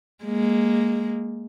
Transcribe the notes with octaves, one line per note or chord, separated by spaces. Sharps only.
G#3 A#3